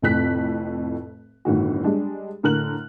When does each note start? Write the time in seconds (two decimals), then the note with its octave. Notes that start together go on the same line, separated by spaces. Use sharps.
0.02 F1 F2 A2 F#6 B6
1.45 G1 A2 D#3 F#4
1.84 G3 G#3 D4
2.43 A2 D3 A#4 F6 F#6 F#7